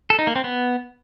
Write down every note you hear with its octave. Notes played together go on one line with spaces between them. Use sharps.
A4
D#4
A#3
C4
B3